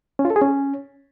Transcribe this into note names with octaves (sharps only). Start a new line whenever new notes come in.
C#4
F4
A4
G#4
C#4